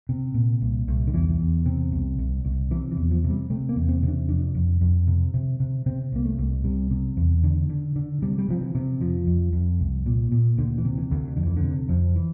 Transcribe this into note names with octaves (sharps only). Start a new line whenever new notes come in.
C3
A#2
C2
C2
D3
E2 E3
E2
C3
C2
C2
C2
C3 E3
E3
E2
F3
C3
G3
C3 A3
A#3
E2
C4
C3
D4
F2 D4
F2
F2
C3
C3
C3
C3 C4
C2 A#3
A3
C2
C3 G3
C3
E2
D3
D3
D3
C3 G3
G3
C3 F3
E3
C3
F2 F3
F2
F2
C2
A#2
A#2
D2 D3
E3
C3
E3
D2
F2 D3
E3
D3
C3
F2
E3